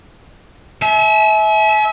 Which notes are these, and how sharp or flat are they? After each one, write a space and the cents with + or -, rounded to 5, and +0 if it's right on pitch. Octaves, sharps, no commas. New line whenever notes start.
E5 -20 G#5 +45